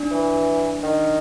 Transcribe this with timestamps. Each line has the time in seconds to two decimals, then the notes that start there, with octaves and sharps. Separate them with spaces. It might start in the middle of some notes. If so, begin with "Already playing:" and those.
Already playing: D4
0.11 E3
0.83 D#3